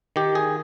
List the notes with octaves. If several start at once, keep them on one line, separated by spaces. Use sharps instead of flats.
D#3 G4
G#4